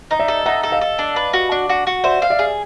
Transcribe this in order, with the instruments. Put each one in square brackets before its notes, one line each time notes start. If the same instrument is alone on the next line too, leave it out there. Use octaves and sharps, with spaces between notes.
[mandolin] D#4 [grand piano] D#5
[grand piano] D5 E5
[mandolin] A4
[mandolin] D#4 [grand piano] E5 F#5
[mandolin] A4
[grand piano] D#5 F5
[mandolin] A4
D4
B4
F#4
D4
F#4
F#4
[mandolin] C5 [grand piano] D5 E5
[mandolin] F5
[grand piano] D5 E5
[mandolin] G#4